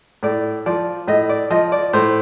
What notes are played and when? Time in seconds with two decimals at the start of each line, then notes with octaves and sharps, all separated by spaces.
0.23 A2 D5
0.66 F3 D5
1.08 A2 D#5
1.29 D5
1.50 F3 D#5
1.72 D5
1.93 A2 C5